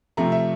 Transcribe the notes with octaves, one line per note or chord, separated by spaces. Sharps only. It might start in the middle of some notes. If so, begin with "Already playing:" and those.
C3 F3 A3 A#5
E5